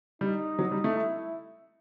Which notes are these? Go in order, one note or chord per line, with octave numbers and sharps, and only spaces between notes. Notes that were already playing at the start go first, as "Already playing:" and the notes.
G3 D#4
F#3
G3
A3
E4